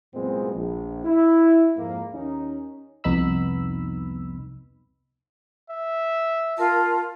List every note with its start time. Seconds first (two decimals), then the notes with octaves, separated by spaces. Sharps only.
0.14 C2 F#2 A#2 G#3 B3 C4
0.53 A#1
1.04 E4
1.76 F2 G#2 A#3
2.12 D#2 C#4 D#4
3.04 C2 F2 B3 D#4 B5 E6
5.70 E5
6.58 F4 A#4 A5